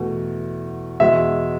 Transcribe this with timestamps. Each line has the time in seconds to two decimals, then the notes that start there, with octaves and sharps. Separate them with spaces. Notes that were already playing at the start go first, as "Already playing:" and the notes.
Already playing: E2 B2 A3 E4
1.00 E2 B2 G#3 E5